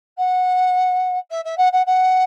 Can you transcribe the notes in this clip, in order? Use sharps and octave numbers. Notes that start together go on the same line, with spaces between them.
F#5
E5
E5
F#5
F#5
F#5